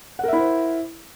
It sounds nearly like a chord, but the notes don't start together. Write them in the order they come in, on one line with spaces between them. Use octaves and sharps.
F#5 A#4 E5 E4 C5